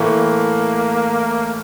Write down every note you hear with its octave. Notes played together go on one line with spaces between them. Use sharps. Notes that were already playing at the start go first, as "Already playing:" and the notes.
Already playing: A2 E3 A3 A#3